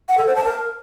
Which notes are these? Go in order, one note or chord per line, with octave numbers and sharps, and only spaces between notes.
F#5
A4
C5
A5
A#4